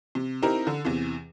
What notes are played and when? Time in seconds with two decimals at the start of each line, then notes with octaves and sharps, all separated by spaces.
0.15 C3
0.42 C4 D#4 E4 G4 A#4
0.67 D3
0.85 E2 C3 E3